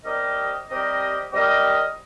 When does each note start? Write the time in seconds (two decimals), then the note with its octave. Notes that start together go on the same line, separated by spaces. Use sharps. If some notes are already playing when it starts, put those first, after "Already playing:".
0.04 G3 C4 G4 A#4 D#5
0.69 G3 C4 G4 A#4 D#5
1.32 G3 C4 G4 A#4 D#5